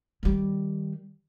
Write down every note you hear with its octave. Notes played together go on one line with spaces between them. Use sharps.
D#3 G3